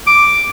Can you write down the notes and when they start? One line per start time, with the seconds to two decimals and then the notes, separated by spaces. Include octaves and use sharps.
0.07 D6